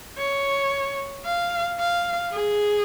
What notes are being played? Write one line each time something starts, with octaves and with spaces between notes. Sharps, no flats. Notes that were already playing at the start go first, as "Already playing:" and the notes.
C#5
F5
F5
G#4